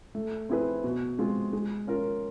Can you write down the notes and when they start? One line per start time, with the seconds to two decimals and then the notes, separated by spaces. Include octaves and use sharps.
0.15 A3
0.49 C4 E4 G#4 B4
0.84 B2
1.19 G#3 C4 F4
1.53 G#3
1.87 C#4 F4 A#4